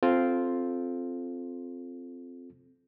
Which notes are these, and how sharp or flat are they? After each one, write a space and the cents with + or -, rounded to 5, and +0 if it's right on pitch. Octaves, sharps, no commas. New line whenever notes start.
C4 +0 F4 +0 A4 -20